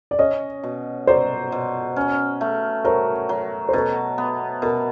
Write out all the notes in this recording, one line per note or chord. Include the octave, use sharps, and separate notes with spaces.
D5
C#4 C#5 D#5
B2
F#3 C5 D5
B2
C#4
A3
F#3 A#4 C5
F#3
C5
B2 A4 B4
B3
B2 A#4